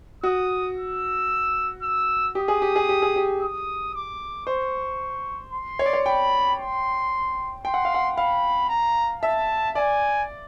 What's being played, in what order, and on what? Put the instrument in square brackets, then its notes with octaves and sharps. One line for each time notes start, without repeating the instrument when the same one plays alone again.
[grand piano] F#4 [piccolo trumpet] D#6
[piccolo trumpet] E6
E6
[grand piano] G4 [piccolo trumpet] D#6
[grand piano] G#4
G4
G#4
G4
G#4
G4
[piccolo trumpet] D#6
D6
[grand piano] C5 [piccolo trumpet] C#6
[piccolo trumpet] C6
[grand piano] C#5
D5
C#5
[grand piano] G5 [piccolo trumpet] B5
[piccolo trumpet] C6
[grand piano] G5 [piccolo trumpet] C6
[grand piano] F#5
F5
F#5
[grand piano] F5 [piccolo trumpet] B5
[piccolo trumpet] A#5
[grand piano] E5 [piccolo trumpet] A5
[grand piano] D5 [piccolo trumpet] G#5